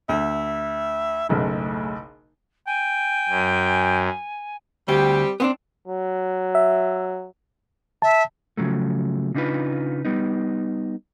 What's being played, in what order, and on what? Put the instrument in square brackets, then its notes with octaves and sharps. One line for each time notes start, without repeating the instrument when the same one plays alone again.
[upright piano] D2 [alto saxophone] E5
[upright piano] F#1 B1 C#3 [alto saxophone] A3
[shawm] G5 [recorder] G#5
[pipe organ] F#2
[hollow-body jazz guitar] D2 [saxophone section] G3 C4 G4
[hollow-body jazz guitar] B3 C4 D4
[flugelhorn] F#3
[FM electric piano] E5
[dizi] E5 [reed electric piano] A5
[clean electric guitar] C#3 F3 F#3 A3
C#3 D4 D#4 F4 B4
G3 B3 D#4